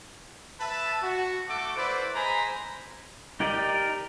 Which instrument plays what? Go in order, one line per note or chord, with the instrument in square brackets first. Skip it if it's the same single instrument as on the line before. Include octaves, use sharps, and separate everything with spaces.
[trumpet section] B4 E5 A5
F#4
A3 A4 F#5 D6
E4 B4 C5 D5
G#3 C5 G#5 A#5 B5
[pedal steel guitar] D#4 G4 A#4 D5 D#5